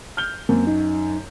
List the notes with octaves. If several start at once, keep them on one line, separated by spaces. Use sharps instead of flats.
F6 G6 G7
F#2 A#3 C4
D#4